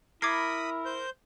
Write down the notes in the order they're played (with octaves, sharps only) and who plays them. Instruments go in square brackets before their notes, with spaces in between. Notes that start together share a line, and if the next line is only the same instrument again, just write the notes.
[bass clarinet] E4 [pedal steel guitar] A#4 [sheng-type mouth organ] B5 D#6 [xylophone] D6 G#6 C7
[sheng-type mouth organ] C5 G6